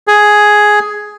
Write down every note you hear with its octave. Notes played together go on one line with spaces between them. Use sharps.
G#4